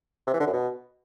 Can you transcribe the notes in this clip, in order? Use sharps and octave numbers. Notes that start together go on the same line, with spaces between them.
C3
E3
D3
F#2
B2